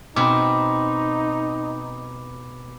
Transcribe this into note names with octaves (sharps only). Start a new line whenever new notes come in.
B2 C4 D#4 B5 D6